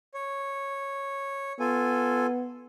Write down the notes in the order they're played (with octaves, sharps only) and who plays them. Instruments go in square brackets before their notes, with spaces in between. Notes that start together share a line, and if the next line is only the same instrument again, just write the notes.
[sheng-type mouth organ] C#5
[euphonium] B3 [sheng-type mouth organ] F4 A4 G#5